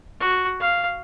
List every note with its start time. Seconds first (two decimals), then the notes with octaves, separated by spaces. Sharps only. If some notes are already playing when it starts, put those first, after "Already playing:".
0.20 F#4
0.60 F5